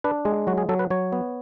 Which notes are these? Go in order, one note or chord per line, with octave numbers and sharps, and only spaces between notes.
D4 B4
G#3 G#4
F#3 F#4
G#4
F#3 A4
B4
F#3 C#5
B3